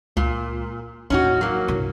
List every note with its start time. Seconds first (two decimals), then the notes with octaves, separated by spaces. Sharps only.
0.17 C#2 A#2
1.10 A1 D#2 C#4 D#4 F#4
1.41 F#3 A#3
1.68 C2 G2